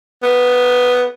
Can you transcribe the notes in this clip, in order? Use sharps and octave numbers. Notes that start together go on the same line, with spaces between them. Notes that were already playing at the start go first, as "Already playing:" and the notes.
B3